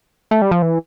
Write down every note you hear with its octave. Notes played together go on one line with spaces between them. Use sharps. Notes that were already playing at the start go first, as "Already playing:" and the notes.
A3
G3
F3
E3